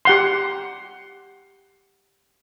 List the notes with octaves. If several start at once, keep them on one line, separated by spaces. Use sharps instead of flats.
G4 F#5 C6